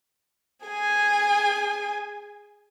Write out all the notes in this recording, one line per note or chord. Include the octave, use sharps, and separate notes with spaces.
G#4 G#5